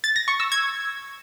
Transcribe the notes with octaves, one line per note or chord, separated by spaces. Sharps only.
A6
A#6
C#6
E6
G#6